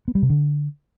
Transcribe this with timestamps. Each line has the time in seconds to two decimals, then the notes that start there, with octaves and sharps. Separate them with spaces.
0.08 B3
0.15 G3
0.22 C3
0.30 D3